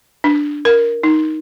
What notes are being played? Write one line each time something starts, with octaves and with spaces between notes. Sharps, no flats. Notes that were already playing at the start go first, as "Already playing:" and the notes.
D4
A#4
D#4